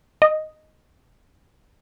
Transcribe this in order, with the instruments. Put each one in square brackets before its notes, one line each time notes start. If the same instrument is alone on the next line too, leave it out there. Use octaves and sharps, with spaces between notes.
[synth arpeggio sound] D#5